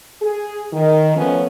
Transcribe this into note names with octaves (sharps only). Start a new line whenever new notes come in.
G#4
D#3
F3 A3 B3 C#4